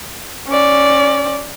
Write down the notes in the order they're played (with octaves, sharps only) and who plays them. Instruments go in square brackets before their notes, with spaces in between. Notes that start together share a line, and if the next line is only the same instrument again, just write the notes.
[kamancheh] C#4 D5